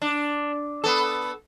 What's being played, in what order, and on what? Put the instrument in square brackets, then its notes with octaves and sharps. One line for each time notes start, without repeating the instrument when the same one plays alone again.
[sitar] D4
B3 A4